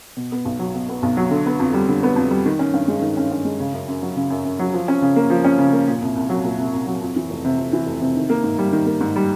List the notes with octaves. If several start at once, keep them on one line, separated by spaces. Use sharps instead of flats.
B2
B3
B1
F#3
B2
B3
B1
F#3
D3
B3
F2
G3
D3
B3
F2
G3
D#3
C#4
G2
G#3
D#3
C#4
G2
G#3
C#3
F#2
F#2
F#3
C#3
F#2
F#2
F#3
F3
C#4
C#3
A#3
F3
C#4
C#3
A#3
A#2
C2
C2
F#3
A#2
C2
C2
F#3
F2
E3
F1
C3
F2
E3
F1
C3
D#3
A#3
G#2
G3
D#3
A#3
G#2
G3